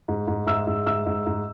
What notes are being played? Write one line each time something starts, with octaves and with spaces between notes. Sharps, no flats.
G#2
G#2
G#2 E5 E6
G#2
G#2 E5 E6
G#2
G#2